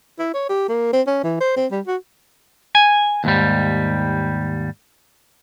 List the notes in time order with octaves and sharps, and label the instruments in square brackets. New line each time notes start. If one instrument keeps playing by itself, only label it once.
[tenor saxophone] E4
C#5
G4
A#3
C4
C#4
E3
C5
C4
G3
F#4
[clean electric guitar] G#5
D#2 G#2 G3